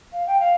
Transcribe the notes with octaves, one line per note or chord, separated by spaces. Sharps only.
F5
G5
F5